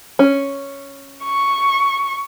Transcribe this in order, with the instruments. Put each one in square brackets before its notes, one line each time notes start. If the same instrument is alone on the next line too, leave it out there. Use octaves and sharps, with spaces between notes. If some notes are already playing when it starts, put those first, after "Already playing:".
[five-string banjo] C#4
[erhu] C#6